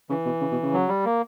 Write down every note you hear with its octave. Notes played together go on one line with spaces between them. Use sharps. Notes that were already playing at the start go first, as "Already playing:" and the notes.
C#3 E3
B2
C#3
B2
C#3
F#3
G3
A#3